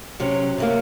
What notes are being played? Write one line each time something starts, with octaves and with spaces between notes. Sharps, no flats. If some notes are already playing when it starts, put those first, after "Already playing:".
C3 F#3 C#4
C3 F#3 A#3